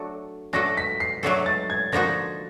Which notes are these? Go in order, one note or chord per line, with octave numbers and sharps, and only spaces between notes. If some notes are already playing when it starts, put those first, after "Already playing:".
Already playing: F#3 A3 D4 F#4 A4
F#3 A3 D4 F#4 A4 A#6
B6
C7
F#3 A3 D4 F#4 A4
A6
G#6
D3 F3 A#3 D#4 F#4 A#6